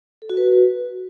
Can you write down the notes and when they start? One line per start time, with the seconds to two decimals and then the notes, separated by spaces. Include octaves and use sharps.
0.22 A4
0.30 F#4
0.37 B4